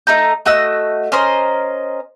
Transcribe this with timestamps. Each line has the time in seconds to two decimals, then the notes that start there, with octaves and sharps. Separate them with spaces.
0.07 A3 D#4 A#5 G6
0.46 A3 F#4 D#5 E6
1.12 C#4 A#4 C5 D#5